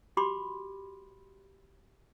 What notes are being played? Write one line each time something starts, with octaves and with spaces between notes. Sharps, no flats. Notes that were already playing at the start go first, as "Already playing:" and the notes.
F#4 G4 B5 C6 D6